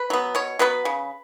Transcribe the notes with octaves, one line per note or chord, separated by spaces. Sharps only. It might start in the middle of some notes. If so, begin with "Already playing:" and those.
Already playing: B4
F#3 B3
B2 C#5
F#3 B3 B4
C#3